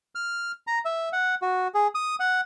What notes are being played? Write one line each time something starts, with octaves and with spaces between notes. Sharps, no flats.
F6
A#5
E5
F#5
F#4
G#4
D#6
F#5